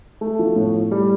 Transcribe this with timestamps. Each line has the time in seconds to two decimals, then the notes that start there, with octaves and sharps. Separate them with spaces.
0.21 A3
0.39 F3
0.56 A2
0.74 A2
0.91 G3